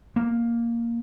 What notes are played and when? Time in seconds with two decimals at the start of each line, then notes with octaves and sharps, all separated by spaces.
0.16 A#3